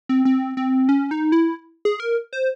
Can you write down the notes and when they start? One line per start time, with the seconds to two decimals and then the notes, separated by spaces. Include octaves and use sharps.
0.09 C4
0.25 C4
0.57 C4
0.89 C#4
1.11 D#4
1.32 E4
1.85 G#4
2.00 A#4
2.33 C5